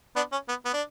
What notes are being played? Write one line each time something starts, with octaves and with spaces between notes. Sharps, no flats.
B3 D4
C#4
B3
B3
D4